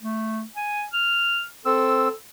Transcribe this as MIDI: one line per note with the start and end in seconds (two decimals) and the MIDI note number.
0.01 0.43 57
0.55 0.85 80
0.93 1.45 89
1.65 2.08 60
1.65 2.12 69
1.65 2.08 88